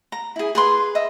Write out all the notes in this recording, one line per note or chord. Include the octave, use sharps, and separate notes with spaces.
A#5
E4 G#4
G#4 B4 C6
D#5 E5